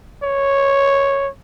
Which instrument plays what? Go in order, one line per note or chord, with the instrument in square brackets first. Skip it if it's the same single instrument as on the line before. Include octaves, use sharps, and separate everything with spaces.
[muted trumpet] C#5